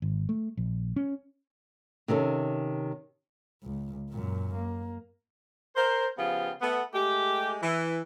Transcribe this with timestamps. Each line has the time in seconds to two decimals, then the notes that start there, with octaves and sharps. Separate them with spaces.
0.02 G#1
0.29 A3
0.57 A#1
0.96 C#4
2.08 C3 D#3 C#4 A4
3.63 C#2
4.10 F#2 A#2
4.55 A#3
5.76 A#4 C5
6.18 C#3 F3 B3 F4 G4
6.62 A3 B3
6.94 G#3 A3 G4
7.63 E3